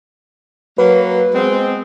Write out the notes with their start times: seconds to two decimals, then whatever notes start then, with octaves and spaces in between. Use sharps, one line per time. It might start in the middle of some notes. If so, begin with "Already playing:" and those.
0.78 F#3 A#3 B4
1.33 G#3 B3 C4